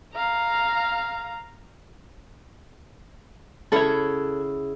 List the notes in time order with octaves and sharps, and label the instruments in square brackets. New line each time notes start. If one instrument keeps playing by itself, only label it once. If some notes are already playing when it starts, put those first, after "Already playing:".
[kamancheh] F5 A#5
[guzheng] C#3 E4 F#5 [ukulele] A4 C#5